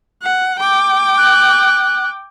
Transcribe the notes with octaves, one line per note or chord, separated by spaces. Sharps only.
F#5
G5 D6
F#6